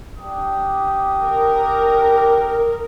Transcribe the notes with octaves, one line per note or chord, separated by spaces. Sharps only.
D4 G4 D#6
A#4